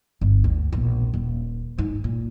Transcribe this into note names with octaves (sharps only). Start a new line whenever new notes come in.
G1
D2
E1 A#1
D#1
G#2
A#2